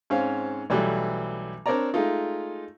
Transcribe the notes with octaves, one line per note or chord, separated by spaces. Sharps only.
G#2 C4 C#4 F5
B1 E3 F#3 G3 A3
C4 D4 A#4 C#5 D5 A#5
G#3 A3 D#4 F4